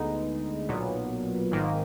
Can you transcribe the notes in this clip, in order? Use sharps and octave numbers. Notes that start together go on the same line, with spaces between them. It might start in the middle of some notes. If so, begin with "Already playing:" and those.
Already playing: D2 D3 G#3 B3 D#4
B1 A#2 F#3 B3
G#1 G#2 D#3 A#3